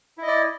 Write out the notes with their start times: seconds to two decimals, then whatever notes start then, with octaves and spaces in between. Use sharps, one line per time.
0.18 E4
0.23 D#5
0.28 D5